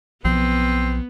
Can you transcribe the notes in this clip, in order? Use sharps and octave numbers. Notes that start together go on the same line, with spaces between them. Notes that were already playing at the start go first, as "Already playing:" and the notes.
B1 F3 B3 C4